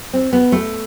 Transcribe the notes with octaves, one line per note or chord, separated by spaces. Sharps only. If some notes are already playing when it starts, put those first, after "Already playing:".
C4
B3
A3